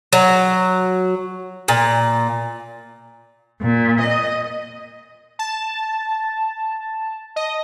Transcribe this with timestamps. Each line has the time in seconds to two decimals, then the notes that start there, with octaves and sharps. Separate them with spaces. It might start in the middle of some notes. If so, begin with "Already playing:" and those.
0.13 F#3
1.68 A#2
3.62 A#2
4.01 D#5
5.39 A5
7.36 D#5